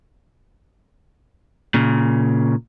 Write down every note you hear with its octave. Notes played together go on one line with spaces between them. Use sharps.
A#2 C#3